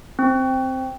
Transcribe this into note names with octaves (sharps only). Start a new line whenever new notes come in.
C4